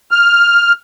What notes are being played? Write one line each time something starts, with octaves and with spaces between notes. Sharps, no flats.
F6